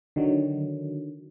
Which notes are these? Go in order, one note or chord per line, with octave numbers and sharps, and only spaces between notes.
D3 D#3 F#3